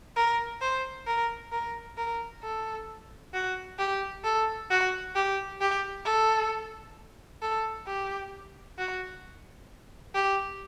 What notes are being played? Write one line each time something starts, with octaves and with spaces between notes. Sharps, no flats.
A#4
C5
A#4
A#4
A#4
A4
F#4
G4
A4
F#4
G4
G4
A4
A4
G4
F#4
G4